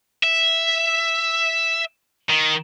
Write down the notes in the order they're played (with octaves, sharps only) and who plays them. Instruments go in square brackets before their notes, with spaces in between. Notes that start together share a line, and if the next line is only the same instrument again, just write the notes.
[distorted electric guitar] E5
D#3